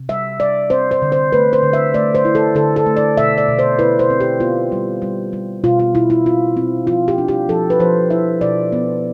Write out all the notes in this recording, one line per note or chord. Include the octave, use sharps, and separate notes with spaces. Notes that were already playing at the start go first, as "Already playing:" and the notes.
Already playing: C3
G3 E5
G3 D5
C4 C5
C5
D3
C5
A3 B4
C5
D3
E5
A3 D5
C5
E4
A4
D3 A4
A4
A3
D5
B2 E5
D5
B2
C5
E4 B4
C5
C4
G4
B3 F4
G3
G3
G3
B2 F4
F4
B2 E4
E4
C4 F4
C4
F3 F4
G4
D4
G4
F3 A4
B4
F3 C5
E4 E5
B2 D5
B3